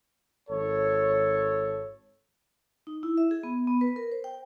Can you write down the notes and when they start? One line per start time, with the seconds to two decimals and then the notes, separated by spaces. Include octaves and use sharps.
0.50 G#1 A4 C#5
2.87 D#4
3.03 E4
3.17 E5
3.31 G#4
3.43 B3
3.67 B3
3.81 B4
3.96 A#4
4.12 C5
4.24 G5